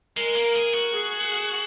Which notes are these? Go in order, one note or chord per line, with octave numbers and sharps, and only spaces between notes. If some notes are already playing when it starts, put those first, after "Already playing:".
G#3 A#4
A#3
G#4
F#4
G#4